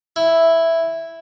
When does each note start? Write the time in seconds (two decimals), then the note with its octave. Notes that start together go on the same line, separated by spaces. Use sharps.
0.16 E4